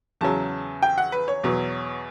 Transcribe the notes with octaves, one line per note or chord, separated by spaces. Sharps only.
E2 C#3 F#3 A5
G5
F#5
B4
C#5
E2 B2 F#3